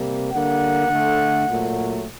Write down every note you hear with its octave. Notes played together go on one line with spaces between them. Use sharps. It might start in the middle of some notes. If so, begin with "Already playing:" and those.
Already playing: C3 G3 A#3
D3 G3 A#3 F#5
D3 A3
A#2 F#3 A3